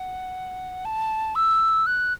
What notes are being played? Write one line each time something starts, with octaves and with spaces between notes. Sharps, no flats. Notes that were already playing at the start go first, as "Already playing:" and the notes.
Already playing: F#5
A5
E6
F#6